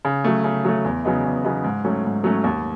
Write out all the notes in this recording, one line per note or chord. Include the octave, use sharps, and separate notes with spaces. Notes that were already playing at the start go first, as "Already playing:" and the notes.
C#3
F#3 A3
C#3
F#3 A3
E2
C#3 F#3 B3 D#4
E2
C#3 F#3 B3 D#4
G#2
F#3 A3 C#4
G#2
F#3 A3 C#4
D#2